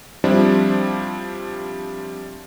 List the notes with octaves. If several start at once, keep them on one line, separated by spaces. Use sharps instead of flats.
F3 G3 C4 D4 E4